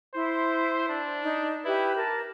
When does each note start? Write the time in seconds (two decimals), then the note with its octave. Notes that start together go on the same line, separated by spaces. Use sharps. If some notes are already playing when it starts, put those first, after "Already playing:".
0.14 E4 C5 C6
0.89 D4
1.22 D#4
1.65 E4 G4 B4
1.99 A#4 A5